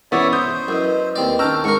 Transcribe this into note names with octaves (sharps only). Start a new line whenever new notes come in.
E3 B3 C#4 C#5 D5 E5 B5
C5 D#6 G6
F#2 E4 B4 D#5
D#2 C4 D5
D#3 C#4 G5 A5 A#5 E6 F6
G#2 A#4 C#6